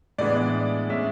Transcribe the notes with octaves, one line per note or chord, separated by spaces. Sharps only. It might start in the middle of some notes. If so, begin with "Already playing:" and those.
A2 E3 G#3 B3 D4 D5
A2 G#3 C#4 E5